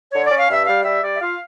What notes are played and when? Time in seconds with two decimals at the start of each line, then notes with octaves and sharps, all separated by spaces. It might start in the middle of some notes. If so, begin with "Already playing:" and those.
0.11 D3 C#5
0.25 C#4 D5
0.38 F5
0.48 G2 E5
0.66 G3 F5
0.83 G3 E5
1.01 G3 D5
1.15 E5
1.20 F4 F5